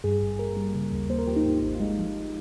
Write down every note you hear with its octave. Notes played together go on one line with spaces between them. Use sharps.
G2 G#4
G#1
A#3 A#4
G3
C#3
D#2
A#3 C5
A#4
F3 G4
D#4
G#2
G#1
F4
G#3 D#4
F3
F3